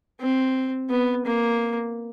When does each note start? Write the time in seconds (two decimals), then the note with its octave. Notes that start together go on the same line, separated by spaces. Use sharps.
0.20 C4
0.90 B3
1.25 A#3